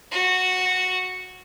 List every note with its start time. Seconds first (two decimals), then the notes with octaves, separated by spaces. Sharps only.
0.11 F#4